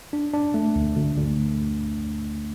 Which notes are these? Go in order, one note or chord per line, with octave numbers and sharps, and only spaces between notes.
D4
D4
A3
D2
D2
D2